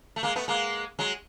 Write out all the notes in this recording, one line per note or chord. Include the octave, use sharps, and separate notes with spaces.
A3
G#3 A#3
A3 B3
G#3 A#3
F#3 G#3